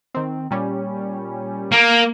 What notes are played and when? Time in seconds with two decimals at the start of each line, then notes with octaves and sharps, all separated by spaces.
0.15 D#3 C4
0.51 A#2 G3 C#4
1.72 A#3